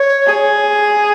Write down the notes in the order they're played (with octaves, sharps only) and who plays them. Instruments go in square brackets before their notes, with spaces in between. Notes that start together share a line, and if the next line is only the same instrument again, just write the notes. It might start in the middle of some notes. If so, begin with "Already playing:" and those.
Already playing: [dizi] C#5
[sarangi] G#4